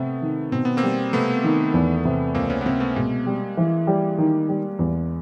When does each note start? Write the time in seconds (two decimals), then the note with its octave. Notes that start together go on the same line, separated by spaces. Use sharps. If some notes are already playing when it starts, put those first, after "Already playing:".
Already playing: C3 A3 B3
0.22 D#3
0.52 B2 C4
0.65 B3
0.77 A#3 C4
0.83 G3
1.13 C3 A3 B3
1.44 D#3
1.74 E2
2.05 C3
2.35 C#2 A#3 C4
2.50 B3 C#4
2.61 B3
2.66 C3 A#3 C4
2.80 A3 B3
2.95 B2 G#3 A#3
3.26 G3
3.57 E3
3.87 G3
4.18 D#3
4.49 G3
4.79 E2